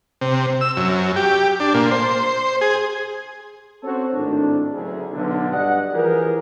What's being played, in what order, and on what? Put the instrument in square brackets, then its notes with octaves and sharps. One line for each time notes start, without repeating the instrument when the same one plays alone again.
[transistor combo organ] C3
E6
F#2
G4
D4
A#2
C5
G#4
[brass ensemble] C4 C#4 F#4 A4 C5 C#5
G#1 A2 D#3 D4
F#1 D2 G#4
B1 D3
G2 D5 D#5 F#5
E3 F3 G4 G#4 A#4